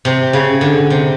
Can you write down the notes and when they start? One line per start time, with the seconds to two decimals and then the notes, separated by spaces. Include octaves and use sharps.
0.05 C3
0.33 C#3
0.61 D3
0.90 C3